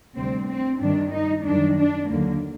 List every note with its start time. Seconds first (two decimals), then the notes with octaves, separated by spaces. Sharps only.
0.17 D2 C3 G3 C4
0.49 C4
0.82 G2 D#3 G3 D4
1.13 D#4
1.46 F#2 D#3 G3 D4
1.78 D4
2.09 D#2 D3 F#3 A#3